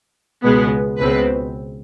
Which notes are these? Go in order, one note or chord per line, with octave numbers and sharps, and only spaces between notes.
C#2 B2 G#3 B3
C#2 B2 G#3 C4 B4